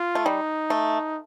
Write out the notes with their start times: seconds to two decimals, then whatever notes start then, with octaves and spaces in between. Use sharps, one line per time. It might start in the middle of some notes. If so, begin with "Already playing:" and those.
Already playing: F4
0.15 A3
0.25 G3 D#4
0.70 A3